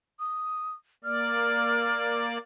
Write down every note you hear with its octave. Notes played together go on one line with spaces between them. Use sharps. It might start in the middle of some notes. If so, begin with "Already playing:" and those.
D#6
A#3 D5 F6